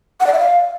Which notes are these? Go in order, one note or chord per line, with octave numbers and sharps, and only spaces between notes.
F#5
D5
E5
F5